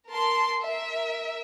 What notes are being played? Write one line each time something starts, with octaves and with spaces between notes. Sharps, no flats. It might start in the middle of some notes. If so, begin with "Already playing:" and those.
A#4 A5 C6
A#4 E5